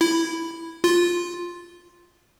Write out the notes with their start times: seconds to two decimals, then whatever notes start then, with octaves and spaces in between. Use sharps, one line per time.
0.01 E4
0.84 F4